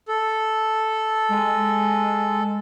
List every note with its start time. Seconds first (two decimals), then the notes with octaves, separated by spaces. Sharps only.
0.08 A4
1.29 G#3